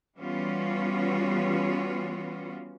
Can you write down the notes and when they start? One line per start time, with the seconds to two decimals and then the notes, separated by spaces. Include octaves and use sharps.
0.18 E3 G3 B3 C#4 F4 F#4